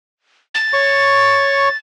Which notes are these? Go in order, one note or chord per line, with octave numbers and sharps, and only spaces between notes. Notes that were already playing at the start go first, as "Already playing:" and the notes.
A6
C#5 C#6